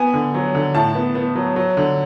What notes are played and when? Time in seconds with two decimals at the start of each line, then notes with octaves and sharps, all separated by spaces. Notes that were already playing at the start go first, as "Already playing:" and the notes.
Already playing: B3 G#5
0.14 D3
0.34 F#3
0.55 D3
0.74 A2 A5
0.95 B3
1.15 B3
1.36 F#3
1.56 F#3
1.77 D3